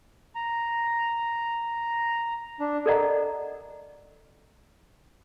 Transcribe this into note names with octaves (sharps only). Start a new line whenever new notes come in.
A#5
D4
A4 A#4 D5 D#5 F#5 A#5